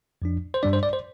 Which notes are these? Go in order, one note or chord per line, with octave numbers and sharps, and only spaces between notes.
F2 F3 D4
C5
G2 G3 D4 D5
C5
D5
C5